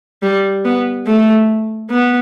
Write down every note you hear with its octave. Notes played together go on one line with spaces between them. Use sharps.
G3
B3
A3
B3